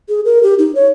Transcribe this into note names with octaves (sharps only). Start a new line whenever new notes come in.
G#4
A#4
G4
D#4
C#5